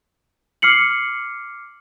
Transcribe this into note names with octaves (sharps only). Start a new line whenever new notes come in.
D6 F6 C7 C#7 F#7